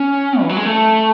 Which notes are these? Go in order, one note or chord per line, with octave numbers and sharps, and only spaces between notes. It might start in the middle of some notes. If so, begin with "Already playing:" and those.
Already playing: C#4
E3
F#3
G#3
A3